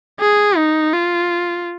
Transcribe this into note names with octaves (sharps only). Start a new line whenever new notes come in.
G#4
D#4
F4